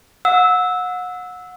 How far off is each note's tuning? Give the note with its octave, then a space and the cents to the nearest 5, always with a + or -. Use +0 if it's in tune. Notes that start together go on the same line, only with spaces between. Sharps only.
F#5 -30 E6 -15